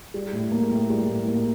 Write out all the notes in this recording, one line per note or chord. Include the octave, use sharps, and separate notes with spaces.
G3
A2
A#3
A2
G3
A2
A#3